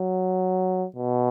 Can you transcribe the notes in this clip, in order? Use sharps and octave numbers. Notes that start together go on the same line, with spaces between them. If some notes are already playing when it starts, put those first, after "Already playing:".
Already playing: F#3
B2